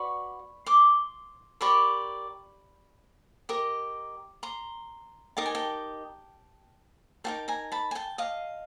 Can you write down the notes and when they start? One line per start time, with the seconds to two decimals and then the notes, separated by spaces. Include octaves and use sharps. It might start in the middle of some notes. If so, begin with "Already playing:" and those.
Already playing: F#4 B4 D5 B5 C#6
0.66 C6 D6
1.61 G4 A#4 D5 B5 C#6
3.49 G4 A#4 D#5
4.43 A#5 C6
5.37 D#4 G4 A#4 D#5 A5
5.46 G#5
5.55 G5 A5
7.24 D#4 F#4 A#4 G5 A5
7.48 G#5 A#5
7.72 A5 B5
7.91 G#5
7.95 G5 A5
8.18 D#5 F5